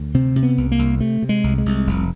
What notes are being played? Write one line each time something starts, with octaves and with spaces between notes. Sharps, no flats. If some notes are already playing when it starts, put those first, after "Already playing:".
Already playing: D2
C3 C4
C3
B3
C2
A#3
C2
C3 A3
C3
G#3
C2
G#3
C2
F1